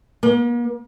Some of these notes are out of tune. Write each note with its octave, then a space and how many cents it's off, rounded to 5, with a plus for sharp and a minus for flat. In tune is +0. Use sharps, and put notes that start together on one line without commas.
A#3 +45